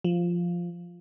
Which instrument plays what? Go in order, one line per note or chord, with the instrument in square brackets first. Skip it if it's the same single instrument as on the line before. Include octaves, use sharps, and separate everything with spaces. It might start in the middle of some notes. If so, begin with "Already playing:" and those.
[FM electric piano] F3